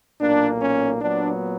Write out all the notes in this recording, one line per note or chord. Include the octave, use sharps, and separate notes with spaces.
B1 A#2 A#3 D4
C#4
A#2 F#3 B3 D4